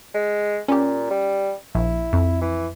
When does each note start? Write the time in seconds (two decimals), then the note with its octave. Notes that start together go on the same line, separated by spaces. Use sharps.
0.14 G#3
0.68 A#2 C#4 G4
1.11 G3
1.75 A#1 E4
2.13 F2
2.41 E3